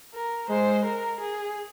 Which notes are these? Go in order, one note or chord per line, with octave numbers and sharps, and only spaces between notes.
A#4
G#3 C5
A#4
G#4